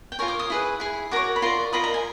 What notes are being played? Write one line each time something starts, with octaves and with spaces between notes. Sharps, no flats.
G5
F4 A#4 C#5 G#5
D6
D#6
E4 G#4 B4
E4 G#4
F#4 A#4 C#5 D6
B5
F4 A#4 D5 C6
F4 A#4 D#5 B5
A#5
G#5